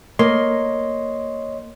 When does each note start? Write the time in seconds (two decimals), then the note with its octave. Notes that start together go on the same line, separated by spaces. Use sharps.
0.19 A#3 C#5 D#5 C6